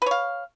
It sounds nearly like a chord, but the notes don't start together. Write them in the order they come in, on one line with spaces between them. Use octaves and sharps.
B4 C#5 F5